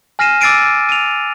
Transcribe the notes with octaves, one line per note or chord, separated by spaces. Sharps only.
G#5 F6 A#6 C7 D#7 E7
D6 E6 A6 C7 D7 D#7
D#7 F7